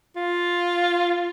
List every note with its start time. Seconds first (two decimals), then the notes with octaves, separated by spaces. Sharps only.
0.16 F4